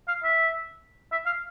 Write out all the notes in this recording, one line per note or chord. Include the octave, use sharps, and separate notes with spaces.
F5
E5
E5
F5